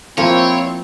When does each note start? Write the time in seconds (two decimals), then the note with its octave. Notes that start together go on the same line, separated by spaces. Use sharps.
0.17 F3 A#3 C4 E4 F4 C#5 G5